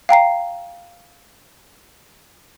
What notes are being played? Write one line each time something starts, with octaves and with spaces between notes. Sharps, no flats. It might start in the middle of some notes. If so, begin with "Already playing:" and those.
F5 G5 A#5 C7